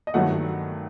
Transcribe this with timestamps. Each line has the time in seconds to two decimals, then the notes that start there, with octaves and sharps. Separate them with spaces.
0.07 D#5
0.14 G2 D#3 F#3 A3 F#5